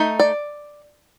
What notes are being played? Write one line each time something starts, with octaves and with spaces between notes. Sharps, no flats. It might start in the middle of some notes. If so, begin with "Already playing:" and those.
Already playing: A3 D#4
D5